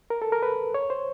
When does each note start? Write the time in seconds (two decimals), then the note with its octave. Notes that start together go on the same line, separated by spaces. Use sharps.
0.10 A#4
0.22 A4
0.32 A#4
0.43 B4
0.74 C#5
0.90 C5